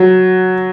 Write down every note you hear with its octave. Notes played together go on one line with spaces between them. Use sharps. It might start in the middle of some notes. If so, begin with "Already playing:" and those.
Already playing: F#3